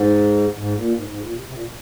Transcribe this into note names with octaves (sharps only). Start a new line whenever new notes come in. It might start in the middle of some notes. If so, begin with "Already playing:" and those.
Already playing: G#2
G#2
A#2
G#2
G#2
A#2
C3
C3
A#2